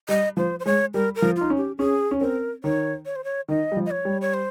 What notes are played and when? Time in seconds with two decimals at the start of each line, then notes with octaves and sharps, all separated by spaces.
0.09 G3 D#5
0.37 F3 C5
0.60 C5
0.65 G#3 C#5
0.94 G3 A#4
1.16 A#4
1.22 F3
1.36 D#4 F4
1.50 C#4
1.57 G4
1.78 C#4 G#4
2.11 C#4
2.21 C4 A#4
2.64 D#3 C#5
3.06 C#5
3.16 C5
3.24 C#5
3.48 D#3 D#5
3.72 G3
3.77 F3
3.86 D#5
3.91 C#5
4.05 G3
4.21 C#5
4.34 C5